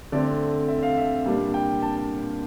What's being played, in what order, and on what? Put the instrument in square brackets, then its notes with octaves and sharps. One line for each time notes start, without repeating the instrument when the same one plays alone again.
[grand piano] D3 A3 C4 D5
E5
F5
E5
A#2 G3 A#3 D4
G5
A5